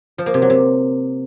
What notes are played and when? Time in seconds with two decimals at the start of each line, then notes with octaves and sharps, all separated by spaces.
0.18 F3
0.26 A#3
0.34 C3
0.42 F#3
0.50 C3